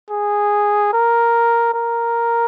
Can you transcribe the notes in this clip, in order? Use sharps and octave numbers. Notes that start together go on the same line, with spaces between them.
G#4
A#4
A#4